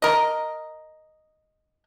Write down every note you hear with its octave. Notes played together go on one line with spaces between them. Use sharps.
A#4 D#5